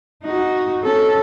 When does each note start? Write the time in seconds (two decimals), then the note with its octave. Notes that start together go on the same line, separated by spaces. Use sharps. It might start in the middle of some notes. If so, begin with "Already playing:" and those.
0.24 D#4 F#4
0.84 C#4 A4